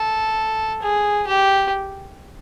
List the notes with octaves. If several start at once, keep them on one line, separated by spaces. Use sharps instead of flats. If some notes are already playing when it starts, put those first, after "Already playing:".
Already playing: A4
G#4
G4